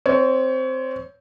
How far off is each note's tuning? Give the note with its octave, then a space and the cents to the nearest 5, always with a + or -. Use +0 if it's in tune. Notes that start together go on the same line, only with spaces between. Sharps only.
C4 -5 C#5 +20